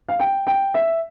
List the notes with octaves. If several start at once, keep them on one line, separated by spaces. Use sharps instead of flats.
F5
G5
G5
E5